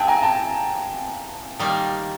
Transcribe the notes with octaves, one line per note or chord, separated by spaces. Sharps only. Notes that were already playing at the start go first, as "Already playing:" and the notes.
Already playing: F#3 B3 E4 G#4 G5 A5
G#5 A#5
G5 A5
D#3 G3 A#3